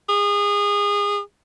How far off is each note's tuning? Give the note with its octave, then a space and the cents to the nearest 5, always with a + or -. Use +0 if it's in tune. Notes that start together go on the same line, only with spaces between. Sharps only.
G#4 -25